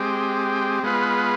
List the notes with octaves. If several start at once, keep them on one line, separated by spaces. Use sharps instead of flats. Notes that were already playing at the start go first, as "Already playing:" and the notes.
Already playing: G#3 C4 G4
G#3 B3 F4 B4